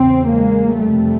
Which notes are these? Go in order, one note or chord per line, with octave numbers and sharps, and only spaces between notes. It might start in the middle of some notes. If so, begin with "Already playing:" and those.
Already playing: E2 C#3 C4
G#3 A#3
F2 C3 G3 A3